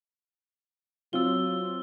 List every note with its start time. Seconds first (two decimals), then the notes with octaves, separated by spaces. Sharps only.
1.13 F#3 C4 F4 E6 G7